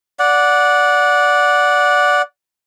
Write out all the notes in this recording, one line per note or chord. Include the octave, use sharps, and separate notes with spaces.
D5 F#5